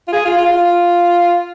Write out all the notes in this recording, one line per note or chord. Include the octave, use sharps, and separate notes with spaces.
F4
G#4
F4
F4
F4